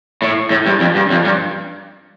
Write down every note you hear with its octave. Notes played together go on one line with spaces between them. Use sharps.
A2
A2
G2
F2
G2
F2
G2